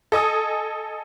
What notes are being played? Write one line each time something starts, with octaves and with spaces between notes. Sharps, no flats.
A4 D#5 G#5 D#6